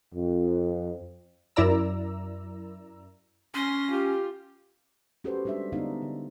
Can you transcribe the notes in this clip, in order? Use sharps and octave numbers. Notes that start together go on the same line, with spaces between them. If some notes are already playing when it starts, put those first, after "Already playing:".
F2
F#2 E4 A#4 D5 A#5 E6
C#4 C6 A#6
F4 G4
C#4 F#4 G4 A4 B4 C5
G3 G#3 D4 A4 E5
D3 G#3 B3 D4 D#4 F5
D3